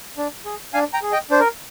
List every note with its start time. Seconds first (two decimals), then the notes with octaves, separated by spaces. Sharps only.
0.17 D4
0.45 G#4
0.74 D4 F5 G#5
0.93 G5 A#5
1.02 G#4
1.12 D#5 G5
1.31 D4 C5
1.40 A#4